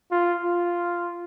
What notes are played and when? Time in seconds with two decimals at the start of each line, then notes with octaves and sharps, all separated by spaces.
0.12 F4
0.44 F4